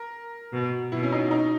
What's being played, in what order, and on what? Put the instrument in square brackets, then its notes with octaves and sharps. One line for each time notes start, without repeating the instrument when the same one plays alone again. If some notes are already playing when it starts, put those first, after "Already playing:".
Already playing: [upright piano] A#4
[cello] B2
[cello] B2 [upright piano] E4
[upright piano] C#4
D#4
D#4